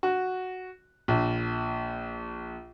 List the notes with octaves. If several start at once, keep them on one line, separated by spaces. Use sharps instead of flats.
F#4
A#1